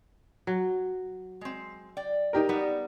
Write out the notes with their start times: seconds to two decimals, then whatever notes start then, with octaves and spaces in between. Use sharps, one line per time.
0.47 F#3
1.41 G#3 C4
1.97 D5 G5
2.33 D#4 G4 A#4
2.49 G3 B3